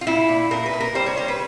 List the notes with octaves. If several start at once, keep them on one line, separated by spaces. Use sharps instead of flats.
F4
A#2 E4
A#2
A#2 A#4
B4
A#2
A#4
G3 C5
C#5
G3 C5
B4